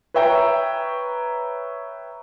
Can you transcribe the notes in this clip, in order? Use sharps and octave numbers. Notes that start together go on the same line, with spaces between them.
B4 C#5 E5 G5 A#5